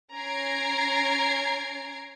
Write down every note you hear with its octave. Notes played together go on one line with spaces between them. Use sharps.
C#4 A#5 G#6 C7 D7